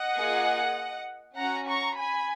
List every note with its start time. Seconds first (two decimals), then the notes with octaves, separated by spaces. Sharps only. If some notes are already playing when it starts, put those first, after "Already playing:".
Already playing: D#5 F#5
0.16 A#3 F4 G#4
1.37 C#4 F#4 F#5 A#5
1.68 A#5 C#6
1.98 G#5 B5